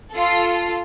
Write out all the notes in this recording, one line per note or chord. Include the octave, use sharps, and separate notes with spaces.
F4 A4